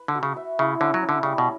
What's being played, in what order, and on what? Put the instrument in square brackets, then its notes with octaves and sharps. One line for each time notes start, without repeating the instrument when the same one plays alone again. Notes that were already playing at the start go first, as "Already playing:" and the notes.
Already playing: [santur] B4
[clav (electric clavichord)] D3
[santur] F#4
[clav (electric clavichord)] C#3
[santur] E5
[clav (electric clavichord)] C#3 [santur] E4
[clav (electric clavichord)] D3 [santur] C#4
[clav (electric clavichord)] F#3
[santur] C#4
[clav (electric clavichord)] D3
[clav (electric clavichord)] C#3 [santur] G3
[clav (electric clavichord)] B2